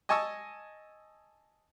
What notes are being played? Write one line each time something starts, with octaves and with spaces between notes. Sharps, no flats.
D#5 G#5 A5 C#6 D#6 E6